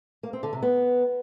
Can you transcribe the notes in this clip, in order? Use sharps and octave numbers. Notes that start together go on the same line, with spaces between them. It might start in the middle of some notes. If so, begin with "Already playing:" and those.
A#3
C4
D3
C3
B3